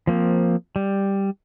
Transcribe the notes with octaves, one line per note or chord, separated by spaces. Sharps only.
F3 A#3 C4
G3